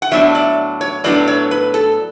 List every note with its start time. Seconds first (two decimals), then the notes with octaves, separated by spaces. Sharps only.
0.02 F#5
0.11 A2 F#3 B3 D4 E5
0.35 D5
0.81 C#5
1.04 A2 F#3 B3 D4 D5
1.27 C#5
1.51 B4
1.74 A4